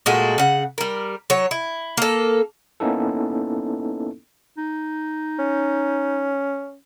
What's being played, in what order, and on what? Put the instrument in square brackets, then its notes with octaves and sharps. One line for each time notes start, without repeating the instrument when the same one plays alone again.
[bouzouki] A#2 G#3 A3 F#4
C#3 F#5
G3 A#4
F#3 C#5
E4
A#3 A4
[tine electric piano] A#3 B3 C#4 D#4 E4 A4
[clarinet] D#4
[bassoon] C#4